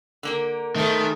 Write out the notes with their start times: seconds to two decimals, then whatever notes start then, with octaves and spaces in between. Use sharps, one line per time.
0.23 D3 A#3 A#4
0.76 G#2 D#3 A3 B3